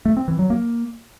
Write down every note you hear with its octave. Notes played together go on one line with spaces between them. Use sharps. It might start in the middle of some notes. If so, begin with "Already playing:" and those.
A3
C4
E3
F#3
A#3